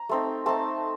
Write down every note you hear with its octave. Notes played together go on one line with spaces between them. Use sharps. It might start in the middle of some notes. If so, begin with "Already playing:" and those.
Already playing: A#5
A3 C4 D#4
A3 C4 D#4 A5